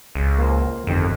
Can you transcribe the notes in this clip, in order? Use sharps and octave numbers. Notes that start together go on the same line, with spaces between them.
C#2
A#3 F4 C5
G1 F2 D#3 G5